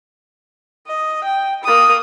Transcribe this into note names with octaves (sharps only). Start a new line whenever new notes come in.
D#5
G5
A#3 D#6